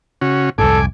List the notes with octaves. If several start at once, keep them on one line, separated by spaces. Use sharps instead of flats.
C#3 C#4 F#4
C2 F2 G#2 A4 G#5 D6